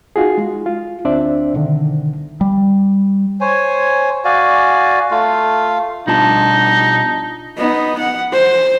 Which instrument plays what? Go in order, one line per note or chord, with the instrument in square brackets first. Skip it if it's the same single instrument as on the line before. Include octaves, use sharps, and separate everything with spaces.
[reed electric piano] D#4 F4 F#4 G#4
G#3
F4
D2 C4 D4 C5 D5 E5
C2 B2 D3 D#3
[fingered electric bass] G3
[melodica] C5 C#5 G#5
F#4 D5 F5 G#5
A3 F4 F5
[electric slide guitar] B2 G3 B4 [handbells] D4 F4 A5 [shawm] D#4
[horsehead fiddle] B3 D#4
F#5
C5